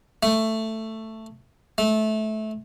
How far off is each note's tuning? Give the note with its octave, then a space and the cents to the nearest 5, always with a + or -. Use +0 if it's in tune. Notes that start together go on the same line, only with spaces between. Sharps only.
A3 +10
A3 -20